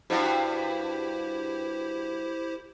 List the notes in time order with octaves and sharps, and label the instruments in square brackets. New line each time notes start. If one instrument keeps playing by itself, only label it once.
[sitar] G2 F#4 [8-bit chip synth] E4 G4 C5